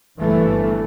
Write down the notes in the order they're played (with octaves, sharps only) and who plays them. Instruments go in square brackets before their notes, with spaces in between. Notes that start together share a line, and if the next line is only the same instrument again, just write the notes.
[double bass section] G1 G2 E3 A3